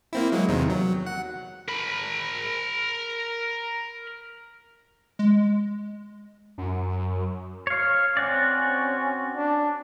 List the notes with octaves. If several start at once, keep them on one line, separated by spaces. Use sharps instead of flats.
A#3 C4 E4
F#3 G#3 A#3
E2 C3 D#3
F#3
F#5
A#4 B5
G#3
F#2
C#5 F5
C4 C#4 F#4 D5
D4